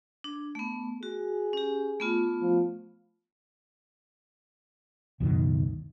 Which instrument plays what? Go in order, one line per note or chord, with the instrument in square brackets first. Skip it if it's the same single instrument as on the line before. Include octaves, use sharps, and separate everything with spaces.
[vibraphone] D4
A3 B3
[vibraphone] F#4 [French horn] G#4
[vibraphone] C#4 G4
A3 B3 F4
[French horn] F3
[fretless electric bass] C#2 F#2 B2 D#3